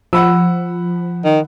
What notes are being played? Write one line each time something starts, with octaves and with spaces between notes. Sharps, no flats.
F3 F#5 B5 E6
D#3